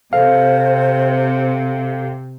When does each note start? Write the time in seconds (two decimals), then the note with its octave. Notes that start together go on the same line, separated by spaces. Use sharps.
0.13 C3 A4 C5 F5